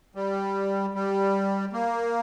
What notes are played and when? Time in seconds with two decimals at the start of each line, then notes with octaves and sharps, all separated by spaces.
0.15 G3
0.94 G3
1.73 A#3